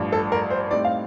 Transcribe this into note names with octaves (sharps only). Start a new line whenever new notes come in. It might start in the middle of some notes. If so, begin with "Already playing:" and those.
Already playing: A1 G2 F3
A4
A#4
C5
A2 G3 C4 D#4 D5
F5